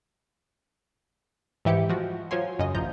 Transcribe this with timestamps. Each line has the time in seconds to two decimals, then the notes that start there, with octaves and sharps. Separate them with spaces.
1.65 G#2 E3 E4 G4 G6 C#7
1.89 F3 F#4
2.31 F3 F#3 C#5 G#5 C6
2.59 F#2 C#3 D#5
2.74 A1 F3 A#5 G6